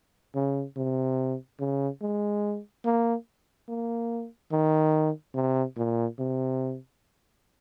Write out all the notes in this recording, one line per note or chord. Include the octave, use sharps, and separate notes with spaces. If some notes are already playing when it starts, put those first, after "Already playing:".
C#3
C3
C#3
G#3
A#3
A#3
D#3
C3
A#2
C3